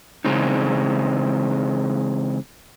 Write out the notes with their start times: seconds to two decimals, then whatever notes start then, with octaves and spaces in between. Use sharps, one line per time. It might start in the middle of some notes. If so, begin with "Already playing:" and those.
0.25 C#3 E3 G#3 C4 D#4